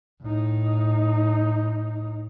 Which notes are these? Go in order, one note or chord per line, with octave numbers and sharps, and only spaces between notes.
A2 D#4